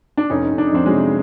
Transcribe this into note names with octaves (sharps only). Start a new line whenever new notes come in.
D4
F1 C#4 D#4
F1
D4
D#4
F2 C4 D4
F#3 G#3
C3